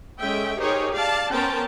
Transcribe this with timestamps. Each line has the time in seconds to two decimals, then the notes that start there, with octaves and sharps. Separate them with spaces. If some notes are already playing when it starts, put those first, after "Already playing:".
0.19 G#3 C#4 A4 E5 G5
0.59 D#4 G4 G#4 A#4 C5 C#5
0.93 D5 F5 A5
1.32 B3 C#4 A#4 C5 G5 A5